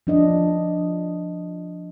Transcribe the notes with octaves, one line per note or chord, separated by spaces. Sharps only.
F3 D4 D#5